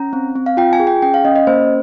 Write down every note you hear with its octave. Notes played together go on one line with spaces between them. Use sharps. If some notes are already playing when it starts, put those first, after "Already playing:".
Already playing: C#4 A#5
C4
C4
F5
F4 G5
G#5
G#4
G5
C#4 G5
F5
C#4 D#5
D#5
A#3 C5